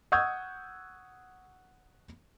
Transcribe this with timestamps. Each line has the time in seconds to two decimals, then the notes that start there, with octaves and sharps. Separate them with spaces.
0.12 F#5 C#6 D#6 E6 G6 G#6